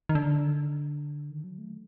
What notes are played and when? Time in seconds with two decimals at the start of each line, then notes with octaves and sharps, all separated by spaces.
0.09 D#3
0.15 D3
1.31 D#3
1.44 F#3
1.58 A3